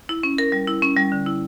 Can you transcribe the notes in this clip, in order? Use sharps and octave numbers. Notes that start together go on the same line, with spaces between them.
E4
C#4
A#4
G3
E4
C#4
G3
D3
E4